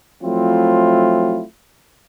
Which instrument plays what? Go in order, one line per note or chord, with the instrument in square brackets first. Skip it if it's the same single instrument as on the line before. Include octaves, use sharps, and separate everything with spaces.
[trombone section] F3 F#3 A3 C4 E4 F4